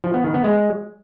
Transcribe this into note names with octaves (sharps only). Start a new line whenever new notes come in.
F3
B3
D#3
B3
G#3